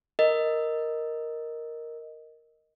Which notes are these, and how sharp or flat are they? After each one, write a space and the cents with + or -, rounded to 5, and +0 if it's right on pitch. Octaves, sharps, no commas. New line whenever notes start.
A#4 +0 D#5 +0